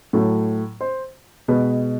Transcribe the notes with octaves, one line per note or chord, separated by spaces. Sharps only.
A2 F#3 A3
C5
B2 G#3 B4